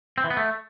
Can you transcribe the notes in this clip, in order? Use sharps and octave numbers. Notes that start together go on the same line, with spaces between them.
C4
E3
B3
A3